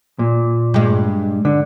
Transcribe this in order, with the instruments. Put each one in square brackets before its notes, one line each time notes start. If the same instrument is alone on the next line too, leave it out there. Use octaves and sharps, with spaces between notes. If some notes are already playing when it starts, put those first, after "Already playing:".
[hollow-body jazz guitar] A#2
[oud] G2 G#3
[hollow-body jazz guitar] D3